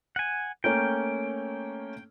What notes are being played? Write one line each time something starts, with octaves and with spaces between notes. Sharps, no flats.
F#5 G#5
A3 A#3 C#4 G5